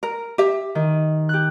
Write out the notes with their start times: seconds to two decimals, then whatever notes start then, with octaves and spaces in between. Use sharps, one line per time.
0.03 A#4
0.38 G4 E5
0.75 D#3
1.29 G4 F#6